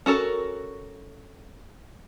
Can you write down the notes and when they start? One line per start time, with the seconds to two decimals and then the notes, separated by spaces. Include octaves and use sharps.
0.06 C#4 F#4 A4 A#4